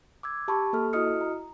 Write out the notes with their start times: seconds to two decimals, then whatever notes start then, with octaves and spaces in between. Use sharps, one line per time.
0.23 D6 E6 G#6
0.48 G4 A5 B5 C#6
0.73 A#3 A4 F6
0.93 E4 F#4 D#5 D#6 F6 C#7
1.21 A#5